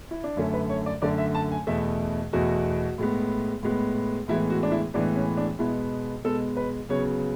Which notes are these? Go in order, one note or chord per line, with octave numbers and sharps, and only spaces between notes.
E4
D4
F#2 D3 A3 C#4
B4
C#5
D5
F#2 D3 A3 D5
E5
A5
G#5
E2 B2 A3 E5
E2 B2 A3 F#4
A2 G#3 B3
A2 G#3 B3
A2 E3 G#3 B3 E4
F#4
D4
E4
A2 E3 G#3 B3 D4
C#4
D4
B2 G#3 B3 E4
B2 G#3 B3 A4
B4
C#3 F#3 B3 C#5